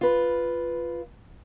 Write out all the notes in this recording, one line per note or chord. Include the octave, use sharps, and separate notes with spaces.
F4 B4